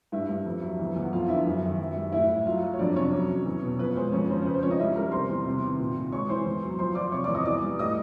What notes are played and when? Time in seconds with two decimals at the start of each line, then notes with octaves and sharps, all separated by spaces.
0.12 G2 E4 E5
0.29 G2
0.45 F2
0.62 F#3
0.79 E2
0.95 E2
1.02 F#5
1.12 F2 F4 F5
1.28 D3 E4 E5
1.45 F#2
1.63 D#3
1.79 F#2
1.96 G3
2.12 A2 E4 E5
2.30 A2
2.45 F#3 F4 F5
2.62 F#3
2.73 C#5
2.79 F2 D4 D5
2.95 C3 C#4 C#5
3.13 F#3
3.29 F#3
3.45 E2
3.63 B2
3.79 F3 B4
3.96 G#3 C5
4.12 F2 C#4 C#5
4.29 C#3 C5
4.42 C5
4.45 G#3 B4
4.54 C5
4.63 F3 C#4 C#5
4.71 D#4 D#5
4.79 G3 E4 E5
4.95 G3 A#4 A#5
5.12 C3 C5 C6
5.29 E2
5.46 C3
5.63 D#3
5.79 A#2
5.95 A#2
6.12 G#3 C#5 C#6
6.29 E3 C5 C6
6.45 E2
6.62 F#3
6.79 F3 C5 C6
6.95 F3 D5 D6
7.12 C3 C#5 C#6
7.24 E2 D5 D6
7.34 D#5 D#6
7.45 E3 D5 D6
7.62 G3
7.79 A2 D#5 D#6